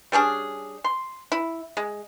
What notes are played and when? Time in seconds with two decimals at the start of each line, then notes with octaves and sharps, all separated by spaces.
0.12 G3 C#4 D4 G#4
0.84 C6
1.32 E4
1.77 G#3